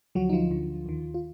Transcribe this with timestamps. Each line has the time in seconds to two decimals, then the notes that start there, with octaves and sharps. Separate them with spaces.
0.15 D2 D3 F3 F#3 F#4
0.29 D#4
0.33 F3 F4
0.51 D2 D3 F3
0.86 D#2 D#3
1.14 F4